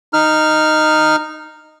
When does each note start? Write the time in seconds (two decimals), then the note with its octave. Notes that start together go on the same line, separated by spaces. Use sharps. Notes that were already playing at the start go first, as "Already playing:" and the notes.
0.13 D#4 F6